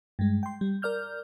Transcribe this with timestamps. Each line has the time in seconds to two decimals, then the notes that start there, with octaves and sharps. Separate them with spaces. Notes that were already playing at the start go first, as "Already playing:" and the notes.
0.19 G2 G#3
0.43 G5 C6
0.61 G3
0.82 A#4 D5 F6 G6